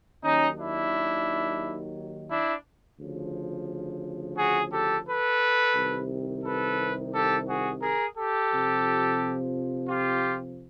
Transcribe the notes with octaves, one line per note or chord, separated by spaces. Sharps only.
D#2 D#3 F#3 C#4 D#4
D4 E4
D4 E4
D2 C#3 F3
F#4 G#4
G4 A4
A4 B4
C2 C3 D#3
A4 B4
G4 A4
F#4 G#4
G#4 A#4
G4 A4
F2 C3 F3
F4 G4